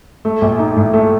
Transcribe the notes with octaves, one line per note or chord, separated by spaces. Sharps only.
A3
A#1
D#4
A2
A3